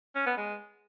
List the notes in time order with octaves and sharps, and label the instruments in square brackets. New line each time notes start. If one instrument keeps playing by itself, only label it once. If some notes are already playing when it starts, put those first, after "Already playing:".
[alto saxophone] C#4
B3
G#3